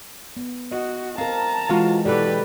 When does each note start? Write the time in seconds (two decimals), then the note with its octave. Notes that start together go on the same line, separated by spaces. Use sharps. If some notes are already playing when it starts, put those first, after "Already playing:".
0.37 B3
0.72 F#4 D#5
1.18 C4 A#4 F5 A5 A#5
1.70 E3 G#3 C4 F4 F#4 F5
2.05 B1 E3 F#4 G4 A4 B4 D5